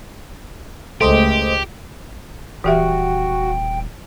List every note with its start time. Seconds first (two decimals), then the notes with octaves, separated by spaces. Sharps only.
1.01 C#2 A3 G4 C5 D#5
2.64 D#1 E3 F#4 G4 E5 G5